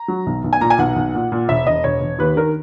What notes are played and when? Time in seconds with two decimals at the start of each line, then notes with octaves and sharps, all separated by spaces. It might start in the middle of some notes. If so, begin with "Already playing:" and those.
Already playing: A#5
0.08 F#3
0.26 B1
0.44 B1
0.53 G#5
0.61 A#2 A#5
0.70 G#5
0.78 B1 F#5
0.96 B1
1.14 A#2
1.32 A#2
1.48 E1 E5
1.66 E1 D#5
1.84 E1 C#5
2.01 E1
2.19 D#2 B4
2.36 D#3 A#4